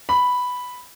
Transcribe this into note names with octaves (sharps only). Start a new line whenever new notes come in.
B5